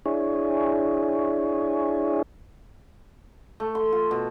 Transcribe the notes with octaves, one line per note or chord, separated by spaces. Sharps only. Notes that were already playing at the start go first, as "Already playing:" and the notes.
D4 E4 G#4 C#5
A3
C6
F4
B2